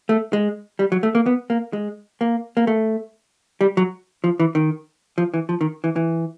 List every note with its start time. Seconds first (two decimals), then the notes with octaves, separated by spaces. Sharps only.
0.09 A3
0.33 G#3
0.79 G3
0.92 F#3
1.03 A3
1.15 A#3
1.26 B3
1.50 A#3
1.73 G#3
2.21 A#3
2.57 A#3
2.67 A3
3.61 G3
3.77 F#3
4.24 F3
4.40 E3
4.55 D#3
5.18 F3
5.34 E3
5.49 F3
5.61 D#3
5.84 E3
5.96 E3